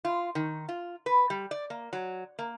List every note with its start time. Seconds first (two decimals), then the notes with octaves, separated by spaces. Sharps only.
0.05 F4
0.35 D#3
0.69 F4
1.06 B4
1.30 G3
1.51 D5
1.70 A#3
1.93 F#3
2.39 A#3